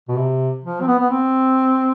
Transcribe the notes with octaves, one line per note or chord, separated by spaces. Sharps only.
B2
C3
F3
C4
B3
B3
C4